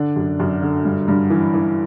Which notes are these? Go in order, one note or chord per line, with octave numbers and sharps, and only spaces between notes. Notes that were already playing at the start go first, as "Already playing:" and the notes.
Already playing: D3 D4
F#2
F#2
D3
G2
G2
E3
E3